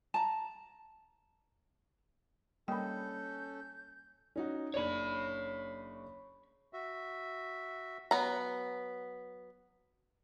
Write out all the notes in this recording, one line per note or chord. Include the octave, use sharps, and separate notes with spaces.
A5 A#5
G3 A#3 C#4 A4 D#5 G5 B5 G6
C#4 D#4 F#4
F#1 D4 C#5 D5 B5
F#4 E5
F#3 B3 A#5